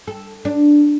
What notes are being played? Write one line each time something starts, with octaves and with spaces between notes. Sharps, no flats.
A4
D4